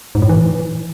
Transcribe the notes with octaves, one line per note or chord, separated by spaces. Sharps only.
G#2
A2
E3